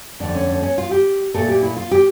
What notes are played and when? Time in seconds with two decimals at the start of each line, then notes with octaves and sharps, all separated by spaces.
0.20 F2 D3 F3 A3 D4
0.35 C#4
0.49 C#4
0.63 C#4
0.78 F4
0.91 G4
1.34 A#2 A3 A4
1.48 G4
1.62 E4
1.77 F4
1.91 G4